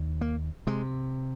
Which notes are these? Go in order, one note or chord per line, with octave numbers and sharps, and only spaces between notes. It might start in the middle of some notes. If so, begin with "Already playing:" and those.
Already playing: D#2
A#3
C3 G#3